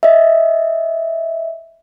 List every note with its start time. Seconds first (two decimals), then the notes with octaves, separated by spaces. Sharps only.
0.03 D#5 E5